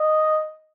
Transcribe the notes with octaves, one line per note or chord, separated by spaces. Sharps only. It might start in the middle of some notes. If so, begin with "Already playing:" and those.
Already playing: D#5